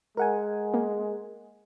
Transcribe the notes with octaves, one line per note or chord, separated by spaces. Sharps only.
G#3 A#4 F#5 G#5
A#3